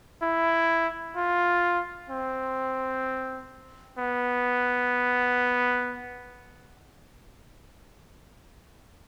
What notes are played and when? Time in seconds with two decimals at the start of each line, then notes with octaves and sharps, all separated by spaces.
0.22 E4
1.16 F4
2.10 C4
3.98 B3